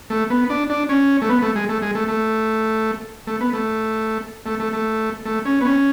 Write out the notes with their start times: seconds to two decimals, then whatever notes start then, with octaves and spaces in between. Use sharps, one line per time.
0.10 A3
0.30 B3
0.50 D4
0.70 D4
0.89 C#4
1.22 A3
1.29 B3
1.42 A3
1.55 G#3
1.69 A3
1.82 G#3
1.95 A3
2.08 A3
3.27 A3
3.40 B3
3.53 A3
4.46 A3
4.60 A3
4.73 A3
5.25 A3
5.45 C#4
5.61 B3
5.65 C#4